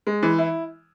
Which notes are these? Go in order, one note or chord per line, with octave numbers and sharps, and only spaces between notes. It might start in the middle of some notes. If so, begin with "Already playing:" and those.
G#3
E3
E4